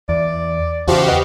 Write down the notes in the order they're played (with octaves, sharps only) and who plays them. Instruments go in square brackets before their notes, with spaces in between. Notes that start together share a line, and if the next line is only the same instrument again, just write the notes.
[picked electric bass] E2 [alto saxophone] D5
[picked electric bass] E2 C#3 [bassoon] F3 [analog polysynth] F#4 G4 F5
[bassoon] B3 [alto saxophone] D#5